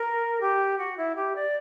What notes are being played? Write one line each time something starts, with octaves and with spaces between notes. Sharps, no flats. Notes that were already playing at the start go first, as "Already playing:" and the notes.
Already playing: A#4
G4
F#4
E4
G4
D5